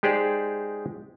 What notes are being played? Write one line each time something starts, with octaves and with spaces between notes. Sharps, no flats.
G#3 D#4 G4 G#4 C5 D5